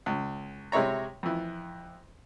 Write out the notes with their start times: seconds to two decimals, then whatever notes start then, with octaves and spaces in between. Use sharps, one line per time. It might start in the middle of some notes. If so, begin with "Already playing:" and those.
0.06 C#2
0.72 C3 G#3 E4 C#5 A#5
1.23 F2 E3